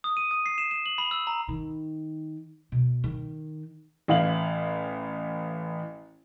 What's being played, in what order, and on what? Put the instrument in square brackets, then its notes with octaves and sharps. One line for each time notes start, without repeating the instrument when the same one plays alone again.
[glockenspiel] D#6
D#7
D#6
C7
E7
E7
F#7
B5
E6
A#5
[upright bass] D#3
B2
D#3
[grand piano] A1 E4 F5 F#7